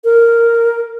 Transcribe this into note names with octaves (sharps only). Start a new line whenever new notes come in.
A#4